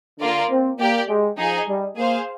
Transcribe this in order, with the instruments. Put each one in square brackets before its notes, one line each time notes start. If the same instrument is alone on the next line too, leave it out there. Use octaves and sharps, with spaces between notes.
[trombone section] D3 [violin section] A#3 F4 A#4 D5
[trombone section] C4
[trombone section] A#3 [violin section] G4 D5 G5
[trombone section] G#3
[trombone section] F3 [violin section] D#4 G#4 D#5 G#5
[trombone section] G3
[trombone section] A#3 [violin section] G#4 C5 F5